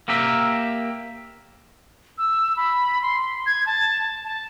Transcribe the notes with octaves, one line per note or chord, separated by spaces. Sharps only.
A#3 G4 A#4 E5
E6
B5
C6
G#6
A5
A5